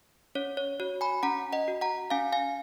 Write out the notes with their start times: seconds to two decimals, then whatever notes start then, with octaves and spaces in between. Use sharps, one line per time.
0.35 C#4 C#5
0.57 C#5
0.80 F#4 C#5
1.01 G#5 B5
1.23 C#4 F#5 A#5
1.53 D#5 F#5
1.68 F#4
1.81 F#5 A#5
2.10 C#4 F5 G#5
2.33 F5 G#5